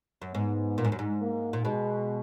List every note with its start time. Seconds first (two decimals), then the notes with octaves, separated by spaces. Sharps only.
0.22 F#2
0.34 G#2 B3
0.78 A#2
0.85 G#2
0.92 F#2
0.99 G#2
1.22 A#3
1.53 A#2
1.64 B2 G#3